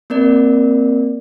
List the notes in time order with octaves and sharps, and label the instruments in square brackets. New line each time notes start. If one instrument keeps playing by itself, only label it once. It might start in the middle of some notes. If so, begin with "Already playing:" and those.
[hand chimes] A#3 C4 A#4 D5